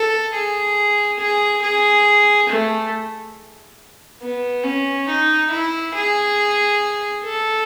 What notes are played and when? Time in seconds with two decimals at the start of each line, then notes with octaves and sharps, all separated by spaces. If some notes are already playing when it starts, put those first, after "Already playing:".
Already playing: A4
0.33 G#4
1.19 G#4
1.62 G#4
2.49 A3
4.22 B3
4.64 C#4
5.07 D#4
5.51 E4
5.94 G#4
7.24 A4